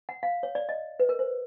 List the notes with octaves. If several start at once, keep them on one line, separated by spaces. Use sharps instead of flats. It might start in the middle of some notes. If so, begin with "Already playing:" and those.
F#5
F5
C#5
D5
D#5
B4
A#4
C5